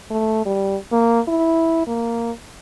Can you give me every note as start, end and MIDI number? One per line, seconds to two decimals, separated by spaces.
0.11 0.45 57
0.46 0.77 55
0.92 1.20 58
1.28 1.86 64
1.87 2.31 58